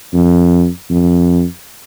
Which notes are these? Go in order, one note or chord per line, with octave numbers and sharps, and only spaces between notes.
F2
F2